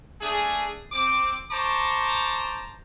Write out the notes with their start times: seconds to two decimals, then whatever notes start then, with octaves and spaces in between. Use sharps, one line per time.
0.21 A3 D4 G#4
0.92 C4 D6
1.51 C5 A5 A#5 C#6 D6